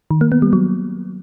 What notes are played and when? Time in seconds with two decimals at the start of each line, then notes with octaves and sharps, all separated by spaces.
0.11 D#3
0.21 A#3
0.32 B3
0.42 G3
0.53 F#3